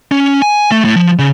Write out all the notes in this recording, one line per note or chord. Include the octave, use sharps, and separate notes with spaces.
C#4
G#5
A3
A2
F3
C#3